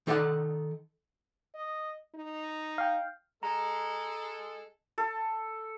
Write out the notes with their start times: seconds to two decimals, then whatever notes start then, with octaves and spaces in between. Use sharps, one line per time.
0.07 D#3 D#4 A4 D5 D#5 F#5
1.54 D#5
2.14 D#4
2.78 F5 G5
3.43 G#3 A4 A#5
4.98 A4